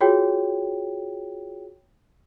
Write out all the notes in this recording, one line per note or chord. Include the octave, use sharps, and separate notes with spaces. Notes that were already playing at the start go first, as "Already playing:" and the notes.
F4 F#4 G#4 C#5 G5